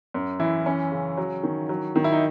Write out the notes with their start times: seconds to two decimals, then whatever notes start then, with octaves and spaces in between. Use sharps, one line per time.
0.14 F#2
0.40 E3 E4
0.66 E3 C#4
0.92 C#3
1.18 F#3
1.43 D#3
1.69 F#3
1.96 D#3
2.04 E4
2.12 D#4